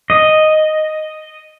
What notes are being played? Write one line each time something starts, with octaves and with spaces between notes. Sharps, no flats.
D#5